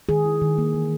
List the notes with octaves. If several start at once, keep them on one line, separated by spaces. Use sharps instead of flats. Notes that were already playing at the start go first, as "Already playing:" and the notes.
D#3 G#4
E4
D#3
A#3
E3